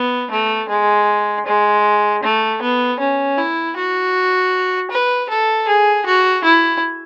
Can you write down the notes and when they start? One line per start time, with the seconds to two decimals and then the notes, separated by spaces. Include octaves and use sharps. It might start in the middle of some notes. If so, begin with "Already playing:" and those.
Already playing: B3
0.31 A3
0.69 G#3
1.46 G#3
2.23 A3
2.62 B3
3.00 C#4
3.38 E4
3.76 F#4
4.91 B4
5.29 A4
5.68 G#4
6.06 F#4
6.45 E4